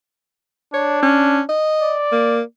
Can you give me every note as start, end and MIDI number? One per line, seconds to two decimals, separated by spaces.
0.74 1.44 62
0.74 1.01 73
1.03 1.41 61
1.49 1.96 75
1.82 2.42 74
2.12 2.41 58